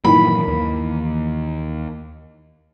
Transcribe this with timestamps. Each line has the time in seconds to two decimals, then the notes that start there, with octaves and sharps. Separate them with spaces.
0.05 G2 A#2 D#3 E3 F#3 A#3 B5
0.48 D#2